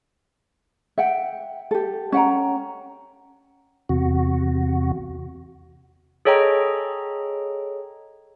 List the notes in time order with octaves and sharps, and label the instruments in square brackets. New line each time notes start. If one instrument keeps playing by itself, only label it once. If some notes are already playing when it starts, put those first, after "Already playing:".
[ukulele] E5 F#5 G5
G4 A4
C#4 F#5 G5 A#5
[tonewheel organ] E2 C3 F#4
[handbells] G#4 A4 C#5 D#5 G5 A#5